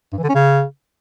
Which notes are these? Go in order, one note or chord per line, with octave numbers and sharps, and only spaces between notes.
G2
E3
D3
C#4
C#3